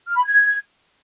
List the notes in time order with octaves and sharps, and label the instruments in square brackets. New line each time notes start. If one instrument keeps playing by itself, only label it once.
[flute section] F6
B5
G#6